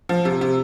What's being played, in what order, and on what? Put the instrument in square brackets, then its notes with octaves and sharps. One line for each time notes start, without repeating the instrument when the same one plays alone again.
[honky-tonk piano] F3
C3
C3